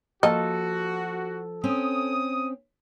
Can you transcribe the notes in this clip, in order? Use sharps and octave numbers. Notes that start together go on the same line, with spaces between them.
F3 A#3 F#4 A4 D#5
C4 C#4 D#6